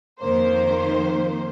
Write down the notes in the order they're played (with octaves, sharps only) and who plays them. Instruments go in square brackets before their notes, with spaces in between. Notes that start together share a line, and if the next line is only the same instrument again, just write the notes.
[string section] F2 D#3 A#3 C5